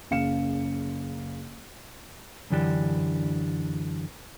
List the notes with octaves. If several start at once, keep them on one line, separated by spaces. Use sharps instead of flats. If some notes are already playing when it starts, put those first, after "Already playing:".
F#1 C#3 F5 C#7 E7
F#2 D3 E3 D4 G4